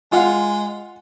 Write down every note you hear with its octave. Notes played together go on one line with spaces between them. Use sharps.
G#3 F4 F5 F#5